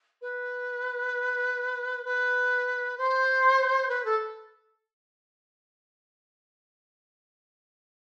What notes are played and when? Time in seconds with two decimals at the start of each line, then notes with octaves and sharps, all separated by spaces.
0.21 B4
2.05 B4
2.97 C5
3.88 B4
4.04 A4